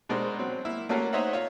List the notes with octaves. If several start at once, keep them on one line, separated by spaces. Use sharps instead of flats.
B2 G#3 D4 A#4 C5
F#3 C4
A#3 E4
A3 A#3 C#4 F#4 A4 A#4
D#4 C5 C#5 D#5 E5 F#5
F4 C#5